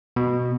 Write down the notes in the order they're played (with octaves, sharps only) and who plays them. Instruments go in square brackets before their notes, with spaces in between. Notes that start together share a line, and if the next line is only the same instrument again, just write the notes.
[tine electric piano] B2